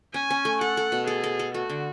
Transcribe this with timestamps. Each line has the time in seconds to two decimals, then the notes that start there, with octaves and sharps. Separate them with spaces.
0.14 C#4 G#5
0.30 C#4
0.45 A3
0.61 A4 F#5
0.77 A4
0.92 B2
1.07 G#4 A4
1.24 A4
1.39 A4
1.54 A3 F#4
1.70 D3